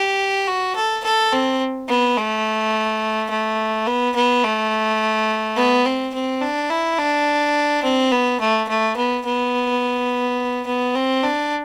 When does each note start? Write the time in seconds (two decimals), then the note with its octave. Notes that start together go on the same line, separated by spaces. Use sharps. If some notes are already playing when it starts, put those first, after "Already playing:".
Already playing: G4
0.48 F#4
0.76 A4
1.04 A4
1.32 C4
1.89 B3
2.17 A3
3.30 A3
3.87 B3
4.15 B3
4.44 A3
5.57 B3
5.85 C4
6.14 C4
6.42 D4
6.70 E4
6.99 D4
7.84 C4
8.12 B3
8.40 A3
8.69 A3
8.97 B3
9.25 B3
10.67 B3
10.95 C4
11.23 D4